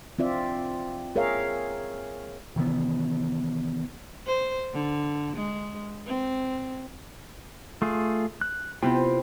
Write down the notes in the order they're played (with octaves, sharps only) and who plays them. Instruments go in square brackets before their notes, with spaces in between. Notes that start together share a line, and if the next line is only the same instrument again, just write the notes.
[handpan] C4 F4 D5 E5
G#4 A#4 C#5 E5 F5
[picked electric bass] C3 D#3 E3 B3
[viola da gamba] C5
D3
G#3
C4
[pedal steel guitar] A3 F4 G#4
F#6
[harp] C3 B3 E4 [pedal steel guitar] F4 G5